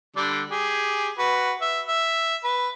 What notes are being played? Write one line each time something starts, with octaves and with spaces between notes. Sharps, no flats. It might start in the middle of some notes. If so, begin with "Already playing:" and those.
D3 G3 D4
G4 G#4
F#4 B4
E5
E5
B4